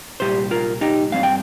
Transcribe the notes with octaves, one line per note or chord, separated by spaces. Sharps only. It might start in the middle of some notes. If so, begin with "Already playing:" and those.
C2 A#2 G3 G4 C5
F4 A#4
D#4 G4
G2 G3 C4 F5
G5